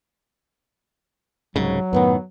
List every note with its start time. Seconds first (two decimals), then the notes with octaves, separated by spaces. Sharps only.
1.56 C2 G#2 C#3 F#3
1.93 F#2 A2 D#3 B3